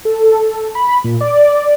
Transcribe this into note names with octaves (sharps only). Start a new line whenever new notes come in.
A4
B5
A#2
D5